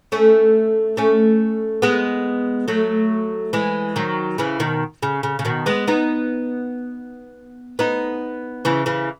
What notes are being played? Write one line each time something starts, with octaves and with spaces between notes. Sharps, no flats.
A3 C#4
A3 C#4
G#3 B3
F#3 A3
E3 G#3
D#3 F#3
C#3 E3
B2 D#3
C#3
C#3
C#3
B2 D#3
G#3 B3
B3 D#4
B3 D#4
C#3 E3
C#3 E3